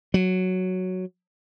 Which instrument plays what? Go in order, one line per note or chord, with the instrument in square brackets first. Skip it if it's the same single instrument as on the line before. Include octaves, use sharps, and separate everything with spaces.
[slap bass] F#3